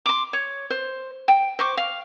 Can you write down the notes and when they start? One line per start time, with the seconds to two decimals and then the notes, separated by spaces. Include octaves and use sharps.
0.06 C6 D6
0.33 C#5
0.70 C5
1.28 G5
1.59 C5 C#6 D6
1.77 F5